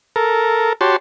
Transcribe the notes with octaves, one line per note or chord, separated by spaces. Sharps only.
A4 A#4
F#4 G4 C#5 A5 C6